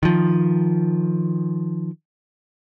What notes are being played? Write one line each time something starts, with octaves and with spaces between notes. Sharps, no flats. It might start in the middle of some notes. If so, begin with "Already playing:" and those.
D#3 F3